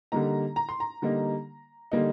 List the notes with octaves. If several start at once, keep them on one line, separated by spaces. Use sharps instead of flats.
D3 G3 A#3 D#4 A#5
A#5
C6
A#5
D3 G3 A#3 D#4
D3 G3 A#3 D#4